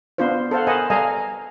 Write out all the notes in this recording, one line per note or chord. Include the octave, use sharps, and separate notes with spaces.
B3 D4 F4 B4 C5
A4 C5 F5 F#5
A#4 B4 D#5 F#5 G#5 A5
G3 A4 D#5 F5 G#5 A#5